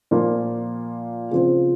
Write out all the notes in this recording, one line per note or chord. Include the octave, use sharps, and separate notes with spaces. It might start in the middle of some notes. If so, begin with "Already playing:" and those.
A#2 F3 A#3 F4
C#3 F3 C4 F4 C5